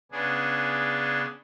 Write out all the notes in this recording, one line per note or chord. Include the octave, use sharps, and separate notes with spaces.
C#3 B3 D4 G#4